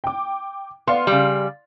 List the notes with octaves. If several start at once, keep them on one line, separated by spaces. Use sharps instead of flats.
G5 D6
B3 D5 F5 C6
C#3 G3